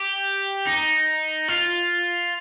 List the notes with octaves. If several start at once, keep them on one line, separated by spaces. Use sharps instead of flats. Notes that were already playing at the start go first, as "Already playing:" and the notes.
Already playing: G4
D#4
F4